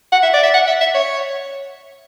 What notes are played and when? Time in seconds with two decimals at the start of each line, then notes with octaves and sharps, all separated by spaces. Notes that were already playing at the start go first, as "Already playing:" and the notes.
0.12 F#5
0.23 E5
0.34 D5
0.43 E5
0.54 F#5
0.67 E5
0.81 E5
0.95 C#5